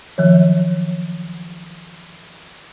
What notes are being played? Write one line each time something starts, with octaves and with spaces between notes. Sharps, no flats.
D#3 F3 F#3 C#5